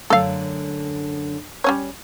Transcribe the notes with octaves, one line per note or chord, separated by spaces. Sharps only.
F#2 D3 A3 A4 F5
G3 C#4 C#5